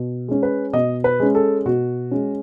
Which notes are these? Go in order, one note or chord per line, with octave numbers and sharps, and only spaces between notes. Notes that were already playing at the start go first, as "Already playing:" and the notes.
Already playing: B2
G#3 C#4
B4
B2 D#5
B4
G#3 C#4
A4
B2 F#4
G#3 C#4